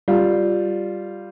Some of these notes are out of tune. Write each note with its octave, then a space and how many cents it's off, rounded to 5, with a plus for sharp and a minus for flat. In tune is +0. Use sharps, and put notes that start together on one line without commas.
G3 +0 F4 +0